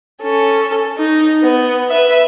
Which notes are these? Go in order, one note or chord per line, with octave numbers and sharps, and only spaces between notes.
C#4 A4
D#4
B3
B4 E5